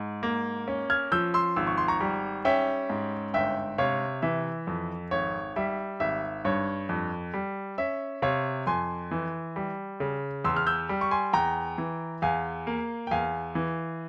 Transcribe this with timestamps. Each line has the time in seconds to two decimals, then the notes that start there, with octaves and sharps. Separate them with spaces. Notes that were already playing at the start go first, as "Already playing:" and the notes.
Already playing: G#2
0.23 A#3
0.68 C#4
0.90 F6 G#6
1.12 F3 E6 G6
1.34 C6 E6
1.56 G#1 E6
1.67 C#6
1.78 C6
1.88 A#5 C#6
2.00 G3
2.45 C#4 E5 G5
2.90 G#2
3.34 G1 E5 G5
3.78 C3 C#5 F5
4.22 E3 E5
4.67 F2
5.11 G#1 C#5
5.56 G3 E5
6.00 G#1 E5
6.45 G2 C#5
6.89 F2
7.34 G3
7.78 C#4 E5
8.22 C3 C#5 F5
8.67 F2 G#5 C6
9.11 E3
9.56 G3
10.00 C#3
10.44 E2 C6 E6
10.56 F6
10.67 E6 G6
10.89 G3
11.01 C#6
11.11 G#5 C6
11.33 E2 G5 A#5
11.78 E3
12.22 E2 F5 G#5
12.67 A#3
13.07 G5
13.11 E2 F5 G#5
13.55 E3